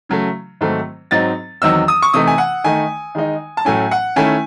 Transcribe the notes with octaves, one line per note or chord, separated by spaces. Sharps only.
C#3 F#3 A3
G#2 D#3 F#3 A3 C4
G#2 F#3 C4 D#4 A6
E2 D#3 F#3 C4 D#4 E6
D#6
C#6
C3 E3 A3 D#4 D#6
G#5
F#5
D#3 A3 D#4 G#5
D#3 G#3 D#4
A5
A2 F#3 A3 C#4 G#5
F#5
D#3 A3 C#4 E4 G#5